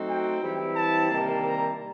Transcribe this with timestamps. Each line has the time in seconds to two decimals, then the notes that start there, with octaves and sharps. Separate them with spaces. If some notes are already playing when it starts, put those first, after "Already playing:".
Already playing: F#3 A3 C4 D#4
0.08 G5
0.43 E3 G3 C4 E4
0.76 A5
1.11 C3 D#3 G3 A#3
1.45 A#5